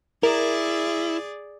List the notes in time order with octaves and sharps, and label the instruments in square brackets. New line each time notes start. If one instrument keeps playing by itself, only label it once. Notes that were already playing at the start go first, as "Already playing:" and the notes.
[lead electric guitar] E4 [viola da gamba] G#4 D5 [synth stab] A#4